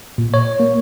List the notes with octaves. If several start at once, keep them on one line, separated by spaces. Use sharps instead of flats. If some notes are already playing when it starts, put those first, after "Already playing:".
A#2
C#5
A#3